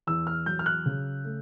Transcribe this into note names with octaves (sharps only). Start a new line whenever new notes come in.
E2 E6
F6
F#3 G6
F6
F#6
C#3
A3